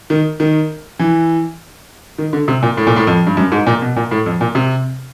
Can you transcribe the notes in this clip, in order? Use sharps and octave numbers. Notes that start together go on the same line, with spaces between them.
D#3
D#3
E3
D#3
D3
C3
A#2
A2
A#2
A2
F2
G2
F#2
G#2
A#2
B2
A#2
A2
F2
A#2
C3